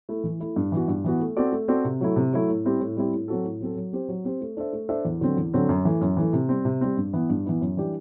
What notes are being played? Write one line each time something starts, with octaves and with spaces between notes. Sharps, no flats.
A3 E4
E3
A3 E4
G2
E3 B3 F#4
G2
E3 B3 F#4
A3
C4 F#4 A4 D5
A3
C4 F#4 A4 D5
C3
F#3 A3 E4
C3
F#3 A3 E4
A2
G3 C4 E4 G4
A2
G3 C4 E4 G4
A2
F#3 C4 F#4 A4
A2
F#3 C4 F#4 A4
F#3
C4 G4 C5
F#3
C4 G4 C5
A3
D4 A4 C5 E5
A3
D4 A4 C5 E5
E2
D3 F#3 C4
E2
D3 F#3 C4
F#2
E3 A3
F#2
E3 A3
C3
G3 C4
C3
G3 C4
G2
E3 B3 E4
G2
E3 B3 E4
F#2
E3 G3 D4 G4